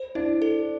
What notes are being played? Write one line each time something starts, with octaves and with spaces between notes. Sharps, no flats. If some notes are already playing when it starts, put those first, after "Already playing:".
Already playing: C5
D4 E4
A4